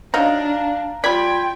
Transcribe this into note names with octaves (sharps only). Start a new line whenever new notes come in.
F#3 D4 D#4 F5 A#5
G3 F4 D5 G5 B5 G#6 B6